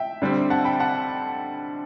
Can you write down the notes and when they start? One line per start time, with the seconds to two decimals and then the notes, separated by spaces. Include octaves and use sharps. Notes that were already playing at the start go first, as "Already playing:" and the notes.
Already playing: E5 G5
0.22 D3 G3 C4
0.50 F#5 A5
0.65 G5 B5
0.80 F#5 A5